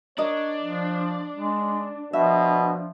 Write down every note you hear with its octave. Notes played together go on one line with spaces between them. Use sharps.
D4 A#4 C#5 D#5
F3
G#3
B2 F3 E5